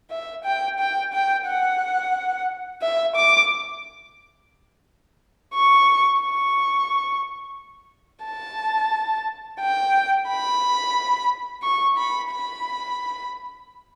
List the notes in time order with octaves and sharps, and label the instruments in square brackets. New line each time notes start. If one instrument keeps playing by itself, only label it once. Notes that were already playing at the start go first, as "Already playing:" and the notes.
[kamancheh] E5
G5
G5
G5
F#5
E5
D6
C#6
C#6
A5
G5
B5
C#6
B5
B5